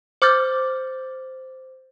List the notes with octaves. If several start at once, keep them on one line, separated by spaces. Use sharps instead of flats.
C5 D6 F6 G6 A6